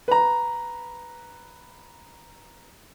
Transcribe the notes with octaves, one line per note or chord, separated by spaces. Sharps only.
B4 A#5